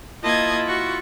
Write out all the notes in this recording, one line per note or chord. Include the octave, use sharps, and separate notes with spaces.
A#3 E4 F4 D#5 A5 G#6
F#4 C#6